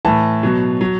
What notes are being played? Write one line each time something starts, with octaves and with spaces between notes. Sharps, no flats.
A2 E3 A5
B2 F#3
F#3